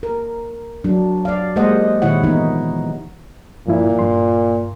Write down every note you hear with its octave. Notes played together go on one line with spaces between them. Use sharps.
A#4
F#3 D4
D5 F5
G#3 A#3 G4 C5 D#5 F#5
A#2 D#3 E4 C#5 F#5
C3 E3 B3 D#4
G2 A#2 F3 E4
G2 C6